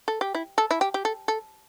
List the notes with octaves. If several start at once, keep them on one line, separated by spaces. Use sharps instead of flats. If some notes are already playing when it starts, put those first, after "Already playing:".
A4
G4
E4
A4
E4
G4
G4
A4
A4